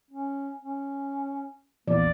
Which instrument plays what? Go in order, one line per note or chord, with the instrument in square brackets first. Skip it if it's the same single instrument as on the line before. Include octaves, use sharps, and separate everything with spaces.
[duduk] C#4
C#4
[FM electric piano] A#1 E2 [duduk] A#3 [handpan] D5